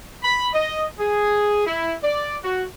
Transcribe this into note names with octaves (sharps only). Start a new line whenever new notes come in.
B5
D#5
G#4
E4
D5
F#4